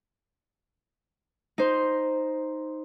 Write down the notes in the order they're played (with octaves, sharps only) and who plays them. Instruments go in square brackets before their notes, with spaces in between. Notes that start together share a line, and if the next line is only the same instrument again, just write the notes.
[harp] D#4 C5